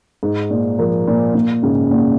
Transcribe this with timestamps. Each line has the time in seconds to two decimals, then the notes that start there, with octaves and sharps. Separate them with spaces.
0.23 G#2
0.50 A#2
0.79 F3 A#3
1.08 A#2
1.35 A#2
1.63 G#2 C#3
1.91 A#2